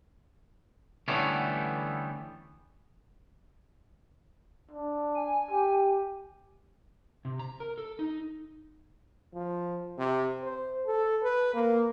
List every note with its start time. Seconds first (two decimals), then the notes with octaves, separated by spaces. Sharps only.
1.08 D3 E3 G3 A3 B3 C#4
4.71 D4
5.15 G#5
5.51 G4
7.25 C3
7.39 A#5
7.60 A#4
7.78 A4
7.99 D#4
9.34 F3
9.98 C3
10.44 C5
10.86 A4
11.22 B4
11.54 A#3